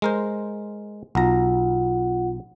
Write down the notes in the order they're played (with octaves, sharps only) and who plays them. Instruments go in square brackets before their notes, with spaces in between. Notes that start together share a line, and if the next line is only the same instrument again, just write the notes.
[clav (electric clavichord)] G#3 A#4 C5
[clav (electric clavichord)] B1 A#5 [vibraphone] F4 F#5